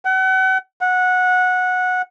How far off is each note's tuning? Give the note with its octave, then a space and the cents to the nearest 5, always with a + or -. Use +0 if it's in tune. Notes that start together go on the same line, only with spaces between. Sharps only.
F#5 +35
F#5 -15